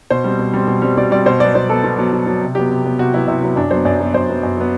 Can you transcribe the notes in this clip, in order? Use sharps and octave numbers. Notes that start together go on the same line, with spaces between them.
B2 C5
G3 C4
B2
G3 C4
B2
G3 C4
B2 D5
G3 C4 D5
B2 C5
F#3 B3 D5
B2 C5
F#3 B3 A4
B2
F#3 B3
B2
F#3 B3
C3
F#3 B3 G4
C3
F#3 B3
C3 F#4
F#3 B3 E4
C3 E4
F#3 B3
F#2 D4
F#3 B3 C5
F#2 D5
F#3 B3
F#2 C5
F#3 B3
F#2
F#3 B3